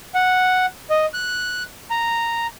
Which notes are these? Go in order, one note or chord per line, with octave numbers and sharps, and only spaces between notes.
F#5
D#5
F#6
A#5